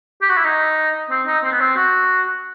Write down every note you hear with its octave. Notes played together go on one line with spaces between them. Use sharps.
G4
F#4
E4
D#4
C4
D#4
C4
B3
C4
F#4